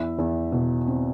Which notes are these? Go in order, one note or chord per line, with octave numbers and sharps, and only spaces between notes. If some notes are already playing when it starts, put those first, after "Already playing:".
Already playing: E2 E4 E5
E2
B2
C4